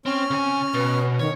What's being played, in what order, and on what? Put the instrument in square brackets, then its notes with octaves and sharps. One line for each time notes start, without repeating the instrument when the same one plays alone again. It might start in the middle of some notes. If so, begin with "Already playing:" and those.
[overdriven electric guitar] C4 [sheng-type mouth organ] C#4 F6
[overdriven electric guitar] C#3 G#5
[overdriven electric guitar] B2 [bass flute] B4
[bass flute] D#3 [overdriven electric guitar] C#5